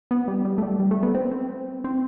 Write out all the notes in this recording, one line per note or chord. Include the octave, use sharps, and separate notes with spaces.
B3
G3
G3
A3
G3
G3
A3
B3
C4
C4
C4